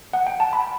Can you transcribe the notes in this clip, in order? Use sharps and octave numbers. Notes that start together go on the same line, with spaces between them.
F#5
G5
A5
B5